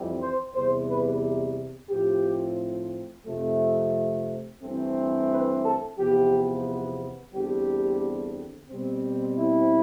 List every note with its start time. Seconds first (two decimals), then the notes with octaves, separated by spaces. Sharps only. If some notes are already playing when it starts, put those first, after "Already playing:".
Already playing: F2 E3 G3 C4
0.21 C5
0.54 E2 C3 G3 C5
0.89 B4
1.90 A2 F3 C4 G4
3.26 F2 C3 F3 A3
4.62 G2 E3 A3 C4
5.30 B4
5.64 A4
5.98 E2 C3 F3 B3 G4
7.33 E2 D3 G3 C4 G4
8.70 B2 G3 C4
9.38 E4